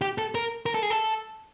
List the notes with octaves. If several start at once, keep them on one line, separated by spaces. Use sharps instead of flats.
G4
A4
A#4
A#4
A4
G#4
A4